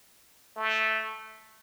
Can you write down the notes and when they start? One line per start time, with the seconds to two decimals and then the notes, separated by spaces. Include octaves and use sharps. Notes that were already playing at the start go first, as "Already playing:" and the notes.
0.56 A3